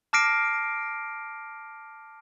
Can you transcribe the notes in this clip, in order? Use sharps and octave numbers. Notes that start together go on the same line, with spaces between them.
A5 D6 F6 A#6 C7 D7